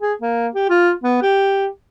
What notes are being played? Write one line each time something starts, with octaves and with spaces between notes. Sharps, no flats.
G#4
A#3
G4
F4
B3
G4